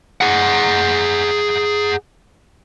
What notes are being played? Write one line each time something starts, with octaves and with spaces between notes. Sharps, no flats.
G#4 F#5